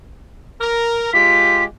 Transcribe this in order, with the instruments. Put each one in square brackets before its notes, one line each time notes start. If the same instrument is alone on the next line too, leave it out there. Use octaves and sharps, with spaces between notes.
[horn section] A#4
[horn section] G#3 F4 G4 [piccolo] B6